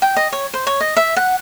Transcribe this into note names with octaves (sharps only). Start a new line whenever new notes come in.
G5
D#5
C#5
C5
C#5
D#5
E5
F#5